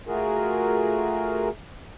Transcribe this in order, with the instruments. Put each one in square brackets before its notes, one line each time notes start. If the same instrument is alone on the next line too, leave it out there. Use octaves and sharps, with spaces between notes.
[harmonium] A3 F4 F#4 G#4 A#4